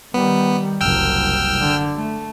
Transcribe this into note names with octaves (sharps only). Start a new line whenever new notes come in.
D#3 G3 B3
F#1 C2 G5 E6 F6
D3
A3